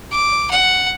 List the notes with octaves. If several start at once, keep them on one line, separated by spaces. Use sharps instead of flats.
D6
F#5